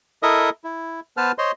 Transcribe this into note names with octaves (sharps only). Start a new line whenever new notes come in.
E4 A4 A#4 D#5 E5 D#6
E4
B3 B4 C5 A5 F6
C5 C#5 D#5 C6